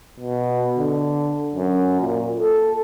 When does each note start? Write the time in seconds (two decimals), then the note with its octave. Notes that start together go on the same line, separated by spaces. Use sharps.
0.20 B2
0.78 D3
1.55 F#2
2.01 A#2
2.37 A4